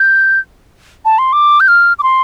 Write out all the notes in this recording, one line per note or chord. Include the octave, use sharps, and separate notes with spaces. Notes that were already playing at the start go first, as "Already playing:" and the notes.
Already playing: G6
A5
C6
D6
G6
F6
D6
C6